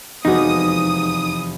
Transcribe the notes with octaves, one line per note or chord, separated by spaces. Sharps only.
F1 E2 G#3 B3 D#4 F#4 D6 D#6